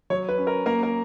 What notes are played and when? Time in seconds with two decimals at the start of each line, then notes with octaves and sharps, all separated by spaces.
0.10 F#3 C#5
0.29 B4
0.38 C#4
0.47 A#4
0.66 A#3 A#4
0.83 A#4